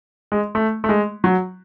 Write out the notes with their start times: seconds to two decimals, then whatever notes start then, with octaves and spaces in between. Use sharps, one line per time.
0.32 G#3
0.55 A3
0.84 A3
0.89 G#3
1.24 F#3